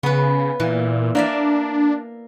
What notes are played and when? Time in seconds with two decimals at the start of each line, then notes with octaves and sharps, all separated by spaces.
0.03 C#3 B3 B4
0.60 A#2 E3
1.15 A#3 D4 D5 E5